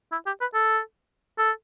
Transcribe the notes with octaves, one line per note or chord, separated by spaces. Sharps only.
E4
G4
B4
A4
A4